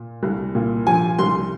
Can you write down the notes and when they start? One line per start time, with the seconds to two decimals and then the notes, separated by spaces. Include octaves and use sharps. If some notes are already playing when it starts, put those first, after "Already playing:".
Already playing: A#2
0.23 C2
0.55 A#2
0.87 F3 G#5
1.19 C2 C6